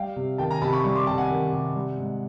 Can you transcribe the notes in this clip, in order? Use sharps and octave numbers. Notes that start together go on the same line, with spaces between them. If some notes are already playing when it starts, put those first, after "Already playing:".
Already playing: G3 F5 G5
C3
D#3 G5 A5
G#5 A#5
C3 A5 B5
B5 C#6
G3 B5 C#6
C6 D6
C3 G5 A5
F#5 G#5
D#3
C3
G3
G#2